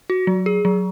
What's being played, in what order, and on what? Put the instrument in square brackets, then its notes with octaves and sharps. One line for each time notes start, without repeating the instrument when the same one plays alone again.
[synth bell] F#4
F#3
G#4
F#3